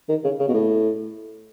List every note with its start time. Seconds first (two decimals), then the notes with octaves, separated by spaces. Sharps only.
0.09 D#3
0.24 C#3
0.39 C#3
0.48 B2
0.54 A2